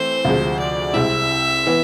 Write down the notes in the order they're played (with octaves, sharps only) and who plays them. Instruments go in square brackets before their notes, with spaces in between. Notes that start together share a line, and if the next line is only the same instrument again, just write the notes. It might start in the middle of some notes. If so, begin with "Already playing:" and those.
Already playing: [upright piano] E3 A3 C4 [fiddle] C5
[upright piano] D2 C3 F3 G#3
[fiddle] D5
[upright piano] C2 C3 G#3 C4 E4 [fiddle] E5
[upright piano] E3 B3